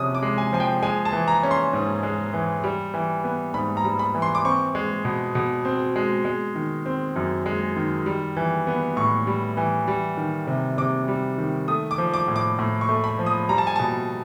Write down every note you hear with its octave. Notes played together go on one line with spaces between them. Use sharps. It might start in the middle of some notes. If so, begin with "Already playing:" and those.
Already playing: C3 F3 C#4 D#6
D6
G#3
G#5
F3 G#5
G5
G#3 G#5
A5
E3
A#5
C#4
C6
G#2
G#3
E3
G3
E3
B3
G#2 B5
A#5
G3
B5
E3
C6
D6
C4 C#6
G#3
B2
B2
C4
G#3
G#3
D#3
C4
F#2
G#3
D#3
G3
E3
B3
A2 C#6
G3
E3
G3
D#3
C3
C3 D6
G3
D#3
A3 D#6
D6
F3
D6
A2
D6
A2
C#6
A3
B5
F3
D#6
G3 A#5
A5
G#5
B2 A5